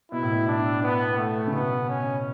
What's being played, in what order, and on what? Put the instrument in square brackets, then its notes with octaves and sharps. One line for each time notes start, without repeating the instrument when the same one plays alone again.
[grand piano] B2 [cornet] E4
[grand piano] A2
B2
[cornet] D4
B3
A3
[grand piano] C#3
[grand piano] B2 [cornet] B3
[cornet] C#4